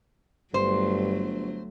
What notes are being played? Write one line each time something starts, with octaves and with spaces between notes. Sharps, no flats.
G1 G2 F#3 A3 C5